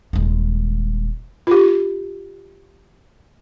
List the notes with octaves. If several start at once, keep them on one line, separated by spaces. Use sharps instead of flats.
D#1 G#3
F4 G4